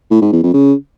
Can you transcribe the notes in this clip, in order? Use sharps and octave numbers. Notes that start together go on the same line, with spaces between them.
A2
G#2
E2
F2
C#3